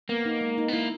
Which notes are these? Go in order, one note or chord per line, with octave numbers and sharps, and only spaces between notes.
A#3 B3
D#4
G#3
D#4
B3
A#3 E4